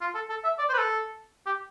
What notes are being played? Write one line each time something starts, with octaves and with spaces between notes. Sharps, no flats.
F4
A4
A4
E5
D5
C5
B4
A4
G4